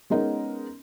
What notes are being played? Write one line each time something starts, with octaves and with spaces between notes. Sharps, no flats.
G#3 B3 C#4 D#4 A#4